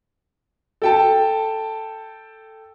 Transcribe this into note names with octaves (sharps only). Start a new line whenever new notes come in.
A4 G5 A5